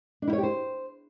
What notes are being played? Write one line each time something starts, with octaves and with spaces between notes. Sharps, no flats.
D4
E4
C#5
G4
C5